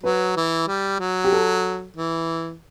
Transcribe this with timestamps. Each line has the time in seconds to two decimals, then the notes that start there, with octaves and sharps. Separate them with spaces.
0.03 F#3 B4
0.36 E3
0.68 G3
1.00 F#3
1.24 G4
1.32 A4
1.97 E3